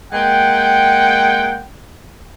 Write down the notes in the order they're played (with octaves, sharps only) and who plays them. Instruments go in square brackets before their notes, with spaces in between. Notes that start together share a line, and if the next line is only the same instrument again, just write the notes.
[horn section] G#3 A#3 F#5 G5